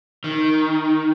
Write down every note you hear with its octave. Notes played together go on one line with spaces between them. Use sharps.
D#3